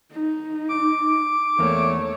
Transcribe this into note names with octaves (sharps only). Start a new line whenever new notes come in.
D#4
D6
E2 A3 A#3 C#5